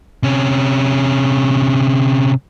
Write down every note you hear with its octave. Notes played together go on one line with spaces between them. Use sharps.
C3 C#4